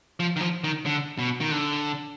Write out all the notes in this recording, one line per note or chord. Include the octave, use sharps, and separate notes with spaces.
F3
D#3
F3
D#3
D3
B2
D#3
D3